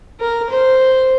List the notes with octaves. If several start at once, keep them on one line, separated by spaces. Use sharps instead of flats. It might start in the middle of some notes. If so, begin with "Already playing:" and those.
A#4
C5